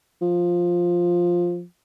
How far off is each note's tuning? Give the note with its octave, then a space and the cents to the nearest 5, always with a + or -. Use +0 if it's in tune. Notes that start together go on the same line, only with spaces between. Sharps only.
F3 +5